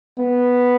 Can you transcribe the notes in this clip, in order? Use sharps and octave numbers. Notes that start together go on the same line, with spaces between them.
B3